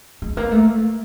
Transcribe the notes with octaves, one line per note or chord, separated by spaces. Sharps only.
G#3
A#3
A3